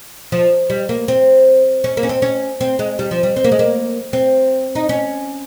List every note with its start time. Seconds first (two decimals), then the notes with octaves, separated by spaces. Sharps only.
0.32 F3
0.70 G3
0.89 A#3
1.08 C4
1.84 C#4
1.97 A#3
2.03 C#4
2.09 C4
2.22 C#4
2.61 C4
2.79 G#3
2.99 G3
3.11 F3
3.23 G3
3.36 C4
3.44 A#3
3.52 G#3
3.59 A#3
4.13 C4
4.75 D#4
4.89 C#4